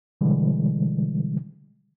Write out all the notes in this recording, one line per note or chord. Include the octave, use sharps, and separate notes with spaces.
B2 D3 E3 G3 G#3